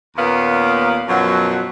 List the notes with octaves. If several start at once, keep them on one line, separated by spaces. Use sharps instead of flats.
D#2 A#2 B3 C#4 A#4 F5
F#2 B2 F3 F#3